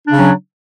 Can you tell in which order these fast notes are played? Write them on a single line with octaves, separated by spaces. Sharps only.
D4 C#3 C#4 F#3